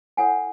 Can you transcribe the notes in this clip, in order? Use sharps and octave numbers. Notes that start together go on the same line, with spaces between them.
E4 A4 C#5 F#5 G#5